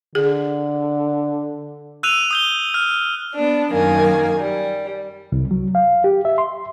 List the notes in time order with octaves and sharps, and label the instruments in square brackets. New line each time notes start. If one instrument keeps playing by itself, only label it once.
[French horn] D3 [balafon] G#4
[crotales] E6 F#6 D#7 F7
D#6 G6 G7
F6
[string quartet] B3 D4
F#2 D#3 A#3 G#5
G3
[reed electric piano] C2
F#3
F5
G4
E5
C6